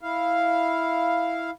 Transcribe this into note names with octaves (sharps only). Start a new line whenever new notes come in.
E4 F5